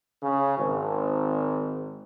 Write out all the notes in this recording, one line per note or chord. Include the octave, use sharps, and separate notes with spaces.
C#3
G#1